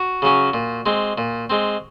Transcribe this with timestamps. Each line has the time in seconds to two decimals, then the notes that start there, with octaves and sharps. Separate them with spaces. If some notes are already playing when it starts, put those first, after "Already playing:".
Already playing: F#4
0.22 C#3 F#3 C#4
0.53 A#2
0.86 G#3 C4
1.18 A#2
1.50 G#3 C4